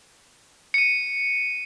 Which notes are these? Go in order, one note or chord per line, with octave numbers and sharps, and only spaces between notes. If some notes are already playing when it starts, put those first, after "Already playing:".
C#7 D#7